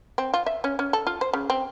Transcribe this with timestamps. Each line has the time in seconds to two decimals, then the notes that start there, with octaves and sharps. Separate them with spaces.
0.18 C4
0.34 F4
0.46 E5
0.64 C#4
0.79 C#4
0.93 A4
1.07 F4
1.21 C5
1.33 C#3
1.50 C4